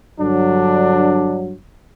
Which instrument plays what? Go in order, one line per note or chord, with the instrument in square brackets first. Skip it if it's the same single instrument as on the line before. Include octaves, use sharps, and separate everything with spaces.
[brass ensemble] G2 F#3 [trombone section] D3 D4